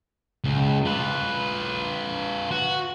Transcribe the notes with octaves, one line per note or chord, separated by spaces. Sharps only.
C#2
F4 B4
F#4